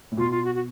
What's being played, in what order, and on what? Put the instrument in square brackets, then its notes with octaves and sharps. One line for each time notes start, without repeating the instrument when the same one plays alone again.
[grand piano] A2
[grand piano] B2 [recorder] F4
[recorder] F4
F#4
F#4